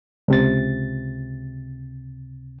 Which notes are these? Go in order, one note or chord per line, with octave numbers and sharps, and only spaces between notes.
C#2 C3 A6